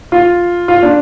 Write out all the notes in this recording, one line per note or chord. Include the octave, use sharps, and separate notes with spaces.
F4
F4
D4